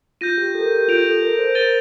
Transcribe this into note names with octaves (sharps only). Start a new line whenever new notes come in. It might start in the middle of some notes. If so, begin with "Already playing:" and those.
F4 G6 A#6 D#7
G4
A4
A#4
A4
G4
F4 G6 D7 F7
A4
A#4
C5
A#4 A6 D#7 G7